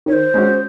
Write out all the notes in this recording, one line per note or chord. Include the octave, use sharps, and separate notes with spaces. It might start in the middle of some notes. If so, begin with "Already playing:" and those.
D#3 C#5
C5
G#3 C#4 F#4